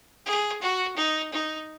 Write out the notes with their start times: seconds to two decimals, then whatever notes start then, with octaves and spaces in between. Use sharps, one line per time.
0.26 G#4
0.61 F#4
0.97 D#4
1.32 D#4